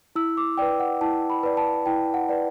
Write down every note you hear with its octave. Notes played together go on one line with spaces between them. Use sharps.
E4 E6
D6
B4 D5 G5
F#5
E4 A5
B5
B4 D5
A5
E4 G5
F#5
B4 D5